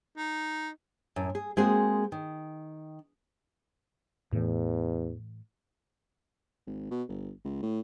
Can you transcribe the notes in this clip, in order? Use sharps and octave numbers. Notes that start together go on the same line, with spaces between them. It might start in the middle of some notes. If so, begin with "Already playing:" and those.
D#4
F#2 A2
G#4
G#3 A#3 C4 F#4 G#4
D#3
E2 A2 E3
G#1
B2
G1
C#2
A2